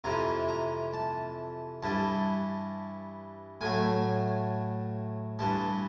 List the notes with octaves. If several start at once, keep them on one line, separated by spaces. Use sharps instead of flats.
F2 C3 E3 A#5
A#5
A5
G2 E3 G3 A5
A2 F#3 A3 G#5
G2 E3 G3 A5